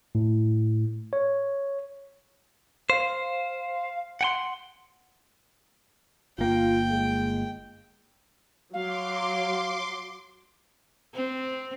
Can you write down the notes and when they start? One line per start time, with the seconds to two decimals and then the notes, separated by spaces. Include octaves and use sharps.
0.15 A2
1.13 C#5
2.90 C5 F5
4.21 F#5 G5 C6
6.39 G1 A#3 F4 G5
6.90 G#3
8.73 F#3 F5 C6 D6
11.14 C4